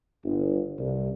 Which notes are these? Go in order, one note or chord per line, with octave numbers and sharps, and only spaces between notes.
G1
C2